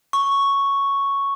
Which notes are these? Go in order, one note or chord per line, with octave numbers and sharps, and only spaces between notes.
C#6